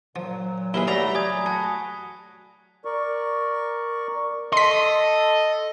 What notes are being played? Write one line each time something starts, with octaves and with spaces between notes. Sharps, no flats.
A#2 F3 F#3
D#2 E4 G#4 A#4 B4 G7
F#3 G3 A3 D5 F5 A#5 B5 B6
D5 G#5 D#6 G#6
F#4 G#4 F#5 A5
A#4 D5 C#6
A4 D#5 C6 B6